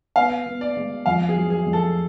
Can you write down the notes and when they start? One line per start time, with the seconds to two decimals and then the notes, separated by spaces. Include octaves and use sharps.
0.16 B3 F5
0.46 B3
0.61 D5
0.77 G#3
1.06 F2 F5
1.29 G#4
1.36 F#3
1.50 G#4
1.66 F2
1.73 A4